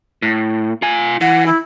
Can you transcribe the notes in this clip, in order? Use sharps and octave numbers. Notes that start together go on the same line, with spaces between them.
A2
F4 G#5
E3 F#5
E4